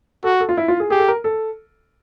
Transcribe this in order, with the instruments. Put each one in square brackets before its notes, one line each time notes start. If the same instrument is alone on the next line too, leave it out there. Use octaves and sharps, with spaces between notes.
[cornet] F#4 [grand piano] A4
[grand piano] A4
F4
E4
F4
G#4
[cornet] G4 [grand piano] G#4
[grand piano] A4
A#4
A4